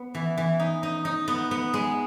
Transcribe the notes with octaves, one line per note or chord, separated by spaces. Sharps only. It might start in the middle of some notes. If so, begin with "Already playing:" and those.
Already playing: B3
E3
E3
D#4
D#4
D#4
B3
B3
G#3